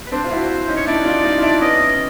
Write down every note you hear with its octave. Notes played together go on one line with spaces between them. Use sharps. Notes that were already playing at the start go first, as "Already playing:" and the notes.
B4
C4 D4 C5
F4
E4 F#4
C#4 D#4
C#5
D4 E4 D5
D#4 F4
D#4 F4
F4
D4 E4
B3 C#4 D#5